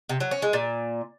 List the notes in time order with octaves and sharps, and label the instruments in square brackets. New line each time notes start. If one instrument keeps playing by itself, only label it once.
[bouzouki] C3
F#3
C#4
G#3
A#2